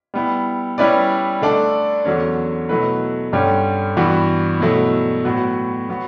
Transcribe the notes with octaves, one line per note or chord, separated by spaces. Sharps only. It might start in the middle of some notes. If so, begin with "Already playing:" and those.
G3 B3 E4
G3 C#4 E4 B4 D5
D3 A3 D4 A4 D5
E2 D3 F#3 C#4
B2 F#3 A3 E4 B4
G2 D3 G3 C#4
G2 E3 B3 F#4
B2 F#3 A3 E4
A2 F#3 B3 F#4
F#3 B3 F#4